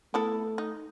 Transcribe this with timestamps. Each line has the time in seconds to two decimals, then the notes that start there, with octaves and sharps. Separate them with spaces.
0.14 A3 B3 E4 A4
0.58 D#4